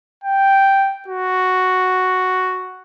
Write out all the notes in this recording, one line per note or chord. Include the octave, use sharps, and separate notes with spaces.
G5
F#4